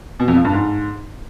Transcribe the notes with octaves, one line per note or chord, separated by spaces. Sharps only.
B2
F2
F3
G2
G#2